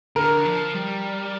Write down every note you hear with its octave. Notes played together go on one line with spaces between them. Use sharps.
D3 A#4
F3
G3